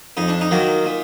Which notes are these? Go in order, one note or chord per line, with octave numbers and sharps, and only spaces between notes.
F2 D#4
D4
D#4
D#3 F#3 A#3
A#2